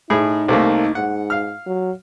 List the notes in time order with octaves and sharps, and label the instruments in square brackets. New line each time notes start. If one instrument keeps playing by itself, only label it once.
[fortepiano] A2 G#4 B5 [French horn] D#4
[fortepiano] C2 A3 A#3
[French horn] G#2 [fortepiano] F#5
[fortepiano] F5 F6
[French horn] F#3